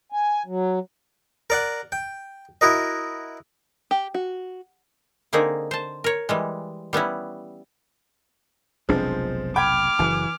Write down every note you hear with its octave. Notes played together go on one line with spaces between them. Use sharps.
G#5
F#3
A#4 D5 F#5
G5
E4 F#4 A#4 D#5
G4
F#4
D3 A#3 C4 D#4 G#4 A#4
C5 A5
A#4 C#5
E3 G3 G#3
G3 B3 C#4 E4
F1 B1 F3 G#3 C4 D4
G5 B5 D6 F6 G#6
F#1 E3